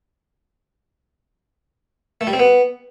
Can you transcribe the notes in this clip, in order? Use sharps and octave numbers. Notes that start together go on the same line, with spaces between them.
A3
G3
C4
B3